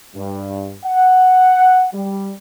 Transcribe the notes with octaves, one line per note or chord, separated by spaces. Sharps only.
G2
F#5
G3